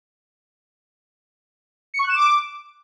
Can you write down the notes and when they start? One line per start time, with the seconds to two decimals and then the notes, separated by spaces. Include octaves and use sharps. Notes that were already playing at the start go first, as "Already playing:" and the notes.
1.94 C#7
1.99 C#6
2.04 F#6
2.09 E7
2.15 D6